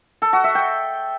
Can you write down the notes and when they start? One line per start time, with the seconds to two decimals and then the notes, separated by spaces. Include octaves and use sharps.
0.22 A4
0.33 F#4
0.44 E5
0.55 G5